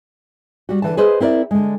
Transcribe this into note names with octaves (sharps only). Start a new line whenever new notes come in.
G3 F#4
D3 E3 A5
G#4 B4 C5 D#5
C4 E4 A#4 C5 D5 E5
D3 G#3